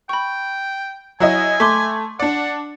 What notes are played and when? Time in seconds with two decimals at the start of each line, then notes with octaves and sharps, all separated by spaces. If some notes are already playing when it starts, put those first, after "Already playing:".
0.09 G5 B5 C#6
1.20 F#3 E4 D#5 G#5
1.60 A3 C6 D6 B6
2.19 D4 D5 F#5